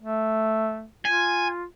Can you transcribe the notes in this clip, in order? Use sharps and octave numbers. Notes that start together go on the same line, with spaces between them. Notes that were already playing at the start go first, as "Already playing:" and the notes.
A3
F4 G#5